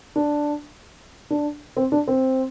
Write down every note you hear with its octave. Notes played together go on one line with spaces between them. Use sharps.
D4
D4
C4
D4
C4